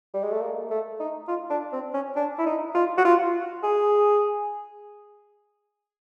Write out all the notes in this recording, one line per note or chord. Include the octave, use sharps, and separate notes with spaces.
G3
G#3
A3
A#3
A3
D#4
F4
D4
C4
C#4
D4
E4
D#4
F4
F#4
F4
G#4